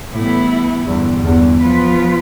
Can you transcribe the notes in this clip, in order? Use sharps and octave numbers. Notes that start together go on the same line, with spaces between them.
A2 E3 G3 B3 E4
E2 G2 D3 G3
E2
F3 B3 F4 B4